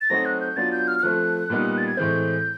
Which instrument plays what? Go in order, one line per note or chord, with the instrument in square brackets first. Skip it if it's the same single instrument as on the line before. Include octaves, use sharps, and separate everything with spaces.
[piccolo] A6
[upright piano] F#3 A3 C4 D#4 F#4 [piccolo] A#6
[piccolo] F#6
G6
[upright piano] F#3 B3 D4 F4 [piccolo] A6
[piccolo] G6
F6
F6
[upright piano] F3 A3 C4 [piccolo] F#6
[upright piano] A#2 G3 B3 D#4
[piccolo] A6
G#6
[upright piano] A2 E3 G#3 C4 [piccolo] G6